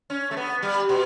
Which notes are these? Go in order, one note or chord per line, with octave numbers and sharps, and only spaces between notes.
C#4
A3
B3
G3
B2